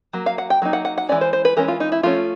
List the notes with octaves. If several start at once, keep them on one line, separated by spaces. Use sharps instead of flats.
F#3 A#3
F5
F#5
G5
F#3 A#3 D#4
F#5
F#5
F#5
E3 G#3 C#4 D5
C5
C5
B4
E3 G#3 C#4 A#4
F4
D#4
E4
F3 A3 C#4 F4